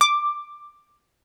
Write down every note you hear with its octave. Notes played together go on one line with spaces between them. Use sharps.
D6